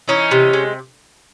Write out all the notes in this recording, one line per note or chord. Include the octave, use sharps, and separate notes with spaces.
E3 C#4 D#4
C3
G#3